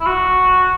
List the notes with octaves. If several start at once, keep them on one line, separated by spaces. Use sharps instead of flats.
E4
F#4